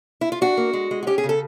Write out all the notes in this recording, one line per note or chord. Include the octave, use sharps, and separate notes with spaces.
E4
F4
D4 F#4
A#3
G#3
G#3
F#4
C#4 G4
G#4
C#3
A4